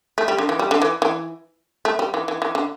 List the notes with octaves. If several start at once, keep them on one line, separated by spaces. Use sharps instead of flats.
A3
G3
D3
E3
G3
D3
E3
E3
A3
G3
E3
E3
E3
D3